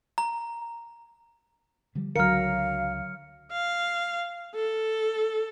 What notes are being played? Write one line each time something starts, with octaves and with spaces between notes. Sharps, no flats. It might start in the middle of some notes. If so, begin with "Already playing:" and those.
A#5
D3 F3 G3
C#2 D3 F#3 A#4 F5 F6 C#7
F5
A4